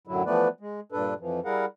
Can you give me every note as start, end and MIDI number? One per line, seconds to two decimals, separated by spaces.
0.07 0.23 42
0.07 0.23 45
0.07 0.23 50
0.07 0.23 54
0.07 0.23 64
0.26 0.48 52
0.26 0.48 53
0.26 0.48 57
0.26 0.48 59
0.26 0.48 71
0.26 0.48 74
0.60 0.80 56
0.92 1.14 43
0.92 1.14 46
0.92 1.14 62
0.92 1.14 69
0.92 1.14 71
1.20 1.40 41
1.20 1.40 52
1.20 1.40 53
1.45 1.65 55
1.45 1.65 64
1.45 1.65 68
1.45 1.65 70
1.45 1.65 77
1.45 1.65 78